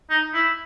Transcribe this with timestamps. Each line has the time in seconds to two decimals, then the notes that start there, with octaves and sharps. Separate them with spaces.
0.10 D#4
0.34 E4